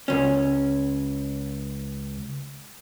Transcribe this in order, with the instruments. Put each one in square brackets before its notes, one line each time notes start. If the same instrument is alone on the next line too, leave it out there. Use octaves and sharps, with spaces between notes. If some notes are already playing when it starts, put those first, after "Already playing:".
[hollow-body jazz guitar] C#2 C#4